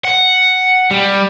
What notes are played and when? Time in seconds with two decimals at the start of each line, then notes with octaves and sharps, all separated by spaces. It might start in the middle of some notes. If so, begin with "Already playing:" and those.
0.05 F#5
0.91 G3